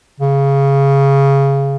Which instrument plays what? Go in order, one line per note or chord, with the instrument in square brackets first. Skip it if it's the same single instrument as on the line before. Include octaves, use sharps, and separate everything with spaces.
[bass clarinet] C#3